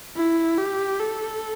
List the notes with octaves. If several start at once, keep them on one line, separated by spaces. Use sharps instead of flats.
E4
G4
A4